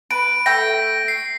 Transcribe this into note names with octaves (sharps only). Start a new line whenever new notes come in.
B4 D7
A3 G5 A#6
C7